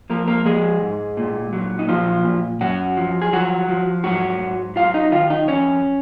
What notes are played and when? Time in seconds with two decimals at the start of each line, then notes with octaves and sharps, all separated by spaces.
0.10 F3 A#3 A#4
0.28 A#3 A#4
0.45 F3 G#3 G#4
0.82 G#2
1.17 A#2
1.53 F#3
1.79 D#4
1.89 A#2 F3 F4
2.25 A#2
2.61 F#2 F#3 F#4
2.97 F3
3.22 G#4
3.32 F3 F#3 F#4
3.69 F3
4.04 G#2 F#3 F#4
4.41 G#2
4.76 F#3 F4 F5
4.94 D#4 D#5
5.12 D#3 F4 F5
5.30 D#4 D#5
5.48 F2 C#4 C#5